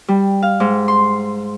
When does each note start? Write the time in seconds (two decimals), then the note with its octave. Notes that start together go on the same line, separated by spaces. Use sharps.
0.08 G3
0.43 F5
0.60 G#2
0.88 C6